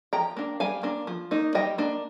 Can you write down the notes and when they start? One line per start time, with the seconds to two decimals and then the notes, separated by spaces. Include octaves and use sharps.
0.13 F3 G5 A#5
0.37 A#3 D4
0.60 G3 F5 G#5
0.83 A#3 D4
1.07 F3
1.31 A#3 D#4
1.55 G3 D#5 G5
1.78 A#3 D4